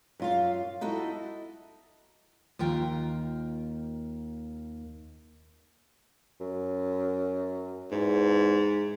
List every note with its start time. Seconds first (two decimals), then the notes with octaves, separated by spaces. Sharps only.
0.20 F#2 F4 F5
0.81 D#4 E4 F#4 A4
2.59 D#2 F4 A#4 G5
6.41 F#2
7.91 E2 G#2